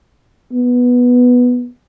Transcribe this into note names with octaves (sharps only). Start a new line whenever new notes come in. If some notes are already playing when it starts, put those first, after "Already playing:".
B3